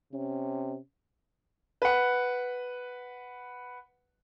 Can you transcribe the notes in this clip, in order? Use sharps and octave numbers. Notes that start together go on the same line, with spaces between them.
C3 C#4
B4 F#5